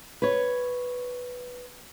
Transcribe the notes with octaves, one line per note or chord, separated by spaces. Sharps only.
B4 C#5